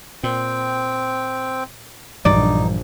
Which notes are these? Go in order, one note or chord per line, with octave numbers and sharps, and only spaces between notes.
A#2 C4 G5
A#1 G2 E3 F#3 D#4 D5